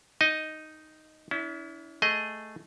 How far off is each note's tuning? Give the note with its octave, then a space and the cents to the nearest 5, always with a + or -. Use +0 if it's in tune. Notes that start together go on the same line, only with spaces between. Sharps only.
D#4 +0 D#5 +0
C#4 +45 E4 -20
A3 +0 G#4 +0 D#5 +5